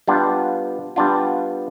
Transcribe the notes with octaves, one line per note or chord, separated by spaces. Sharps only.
G3 B3 D4 F4
G3 B3 D4 F4